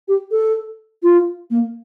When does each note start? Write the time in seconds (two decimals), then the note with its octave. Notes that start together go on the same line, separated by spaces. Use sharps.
0.08 G4
0.31 A4
1.03 F4
1.50 A#3